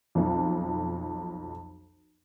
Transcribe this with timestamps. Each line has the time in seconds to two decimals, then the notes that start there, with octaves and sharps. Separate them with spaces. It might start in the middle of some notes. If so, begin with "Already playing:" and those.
0.15 B1 F2